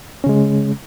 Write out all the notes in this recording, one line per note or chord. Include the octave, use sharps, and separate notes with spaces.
C#3 G#3 C#4